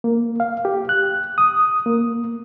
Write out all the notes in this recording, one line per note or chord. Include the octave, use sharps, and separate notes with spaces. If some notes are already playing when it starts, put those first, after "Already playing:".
A#3
F5
G4
F#6
D#6
A#3